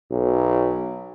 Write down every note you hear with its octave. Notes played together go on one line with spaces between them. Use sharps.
B1